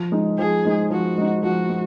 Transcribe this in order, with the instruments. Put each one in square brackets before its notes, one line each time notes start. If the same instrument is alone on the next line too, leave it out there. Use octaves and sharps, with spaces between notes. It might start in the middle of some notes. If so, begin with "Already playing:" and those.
Already playing: [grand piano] F3
G#3 D#4
[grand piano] F3 [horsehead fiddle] G#4
[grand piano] G#3 D#4
[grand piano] F3 [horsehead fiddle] F#4
[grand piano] G#3 D#4
[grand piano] F3 [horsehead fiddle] F#4
[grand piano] G#3